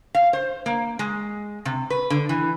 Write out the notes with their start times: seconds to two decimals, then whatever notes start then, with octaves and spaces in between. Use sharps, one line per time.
0.15 F5
0.33 C5
0.66 A#3
0.99 G#3
1.65 C3
1.90 B4
2.10 D3
2.29 E3